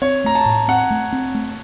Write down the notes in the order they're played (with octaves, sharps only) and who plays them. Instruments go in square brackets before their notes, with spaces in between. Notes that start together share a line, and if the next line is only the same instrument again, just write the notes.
[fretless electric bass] C4 [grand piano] C#5
[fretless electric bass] A3 [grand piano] A#5
[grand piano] A5
[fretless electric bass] A2
[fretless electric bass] C4 [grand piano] F#5
[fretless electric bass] A3
C4
A3